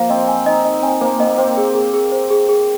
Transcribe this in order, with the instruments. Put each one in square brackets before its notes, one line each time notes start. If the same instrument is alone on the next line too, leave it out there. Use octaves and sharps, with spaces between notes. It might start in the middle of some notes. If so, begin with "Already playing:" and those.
Already playing: [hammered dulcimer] F3 A#3 [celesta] F5
[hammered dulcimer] C4 [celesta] D#5
[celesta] G#5
[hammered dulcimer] D#4 [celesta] D#5
[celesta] D#5
[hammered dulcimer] C4 [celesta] G#5
[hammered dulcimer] A#3 [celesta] C5
[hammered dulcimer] A#3 [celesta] D#5
[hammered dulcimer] C4 [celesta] C5
[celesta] G#4
G#4
G#4
C5
G#4
G#4